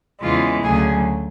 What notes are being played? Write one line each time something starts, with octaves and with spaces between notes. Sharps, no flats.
E2 C#3 E3 G#3 F4
D2 C#3 F#3 G#4